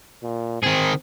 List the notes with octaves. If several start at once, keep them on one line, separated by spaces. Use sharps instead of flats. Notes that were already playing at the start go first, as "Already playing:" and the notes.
A#2
D#3 C4 G#4